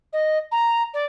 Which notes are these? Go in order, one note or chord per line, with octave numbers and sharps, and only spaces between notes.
D#5
A#5
D5